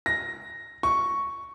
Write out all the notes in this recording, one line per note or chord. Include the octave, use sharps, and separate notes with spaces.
A#6
C#6